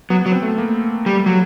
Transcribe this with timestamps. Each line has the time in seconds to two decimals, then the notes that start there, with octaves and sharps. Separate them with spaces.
0.10 F#3 B3
0.21 B3
0.26 F#3
0.32 C4
0.43 A3
0.58 A#3
1.06 G3
1.26 F#3